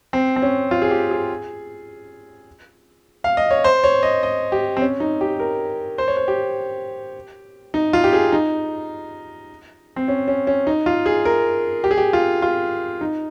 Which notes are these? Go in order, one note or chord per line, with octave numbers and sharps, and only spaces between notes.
C4
C4
C#4
F4
G#4
G4
G#4
F5
D#5
C#5
C5
C#5
D#5
D#5
G4
C4
C#4
D#4
G4
A#4
C5
C#5
C5
G4
D#4
F4
G4
G#4
D#4
C4
C#4
C#4
C#4
D#4
F4
G#4
A#4
G4
G#4
G4
F4
F4
D#4